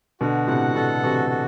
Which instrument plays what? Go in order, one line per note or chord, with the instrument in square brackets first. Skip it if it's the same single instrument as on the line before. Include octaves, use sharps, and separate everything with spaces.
[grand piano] B2 D3 [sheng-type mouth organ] F#4
[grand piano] A2 C3 [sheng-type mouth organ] F#5
[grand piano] B2 D3 [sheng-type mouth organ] A4
[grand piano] C3 E3 [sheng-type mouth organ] F#4
[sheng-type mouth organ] F#4